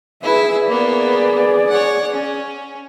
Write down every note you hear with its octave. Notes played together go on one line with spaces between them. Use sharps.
E4 G#4 B4 E5
A#3 B3 G#4 D5
C#5 F#5
C#4